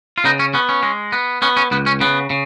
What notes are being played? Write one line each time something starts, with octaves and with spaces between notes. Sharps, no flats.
F4
C#3 B3 D#4
C#4
B3 C#4
C#4
G#3
B3
B3 C#4
C#4
C#2 B3
C#4
C#3 B3
C#3